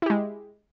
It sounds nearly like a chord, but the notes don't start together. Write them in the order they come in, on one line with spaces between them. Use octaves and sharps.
E4 G4 G#3